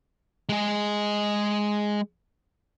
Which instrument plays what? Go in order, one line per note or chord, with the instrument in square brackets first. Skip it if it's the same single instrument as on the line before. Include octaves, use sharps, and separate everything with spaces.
[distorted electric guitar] G#3 G#4